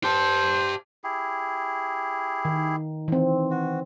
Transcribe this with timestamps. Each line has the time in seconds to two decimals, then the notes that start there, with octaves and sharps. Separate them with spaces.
0.04 G4 C5 A5
1.04 E4 G4 G#4
2.45 D#3
3.08 E3 C4
3.51 F#4